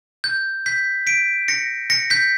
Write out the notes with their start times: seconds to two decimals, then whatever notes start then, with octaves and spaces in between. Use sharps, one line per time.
0.24 G6
0.66 G6 B6
1.07 B6 D7
1.48 A#6 C#7
1.90 A#6 C#7
2.10 G6 B6